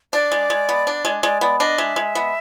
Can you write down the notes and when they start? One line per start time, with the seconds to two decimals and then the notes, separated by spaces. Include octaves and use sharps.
0.13 D4 D5
0.32 G#3
0.50 G#3
0.69 B3
0.87 D4
1.05 G#3
1.23 G#3 D5
1.41 B3 D5
1.60 D4 D#5
1.78 G#3 E5
1.96 G#3
2.15 B3